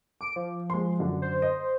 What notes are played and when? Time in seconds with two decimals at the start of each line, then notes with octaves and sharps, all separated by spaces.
0.21 D6 D7
0.36 F3
0.70 G#3 C6
0.99 F#2 D3 F#4
1.22 C5
1.42 D#5